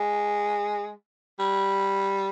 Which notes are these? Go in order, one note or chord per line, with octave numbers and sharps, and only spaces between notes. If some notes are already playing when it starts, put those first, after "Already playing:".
Already playing: G#3
G3